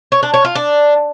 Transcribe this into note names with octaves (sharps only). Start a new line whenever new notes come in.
C#5
D4
C#5
F4
D4